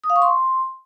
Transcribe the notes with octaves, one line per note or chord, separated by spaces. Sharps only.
D#6
F5
C#6
C6